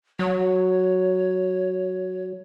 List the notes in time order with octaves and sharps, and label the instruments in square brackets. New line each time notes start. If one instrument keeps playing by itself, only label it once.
[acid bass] F#3 [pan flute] C#5